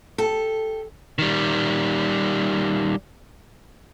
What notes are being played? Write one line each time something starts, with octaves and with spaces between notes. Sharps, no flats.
G4 A4
D#3 G3